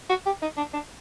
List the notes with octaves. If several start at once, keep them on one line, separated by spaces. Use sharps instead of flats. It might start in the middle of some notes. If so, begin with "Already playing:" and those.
F#4
G4
D#4
D4
D4